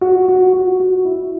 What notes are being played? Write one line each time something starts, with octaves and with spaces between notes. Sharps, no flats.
F#4
F#4
F#4
F#4
E4